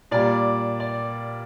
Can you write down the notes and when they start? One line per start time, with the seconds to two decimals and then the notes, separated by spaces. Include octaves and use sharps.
0.11 A#2 G3 D5
0.80 D5